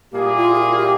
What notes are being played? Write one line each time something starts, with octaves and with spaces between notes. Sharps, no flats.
A#2 G3 A#3 E4 G4 G#4
F4
G4
F4
G4